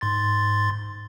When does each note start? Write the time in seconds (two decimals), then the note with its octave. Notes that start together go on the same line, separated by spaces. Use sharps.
0.01 G#2 C6 A6